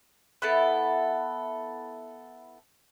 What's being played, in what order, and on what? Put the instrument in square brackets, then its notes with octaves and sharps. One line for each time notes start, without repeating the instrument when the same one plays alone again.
[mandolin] B3 E4 A4